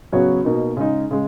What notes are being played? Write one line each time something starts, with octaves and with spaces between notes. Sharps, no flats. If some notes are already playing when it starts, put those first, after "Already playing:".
C#3 F#3 B3 F#4 C#5
B2 A#3 D#4
C#3 G#3 D#4
C#3 G#3